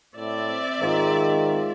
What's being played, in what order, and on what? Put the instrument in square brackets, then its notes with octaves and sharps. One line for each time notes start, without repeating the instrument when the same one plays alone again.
[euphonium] A2 [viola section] C4 D5 E5
[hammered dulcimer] G#2 F4 [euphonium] D#3